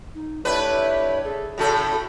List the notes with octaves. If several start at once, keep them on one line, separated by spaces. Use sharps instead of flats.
D#4
A3 D4 E4 G4 B4 C#5
G#4 A4
A2 C#3 F#4 A4 G5 B5